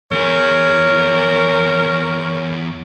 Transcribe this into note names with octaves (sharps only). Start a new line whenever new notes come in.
E2 G#4 A#4 C#5